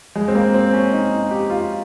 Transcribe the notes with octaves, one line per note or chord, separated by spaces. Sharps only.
G#3
C4
A#3
C4
C#4
D#4
D#4
G4
F4